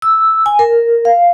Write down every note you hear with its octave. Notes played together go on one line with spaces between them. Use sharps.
E6
G#5
A#4
F5